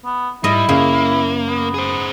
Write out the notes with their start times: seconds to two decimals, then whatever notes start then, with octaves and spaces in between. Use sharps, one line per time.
0.05 B3
0.44 G#2 G3 E4 D#5
0.69 F#2 C#3 A#3
1.46 B3
1.74 G#4 C5